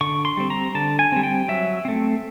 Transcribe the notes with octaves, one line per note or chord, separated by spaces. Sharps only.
D3 C#6
C6
G3 C4
A#5
D3 A5
G#5
G3 C4
G5
F#3 E5
A3 C4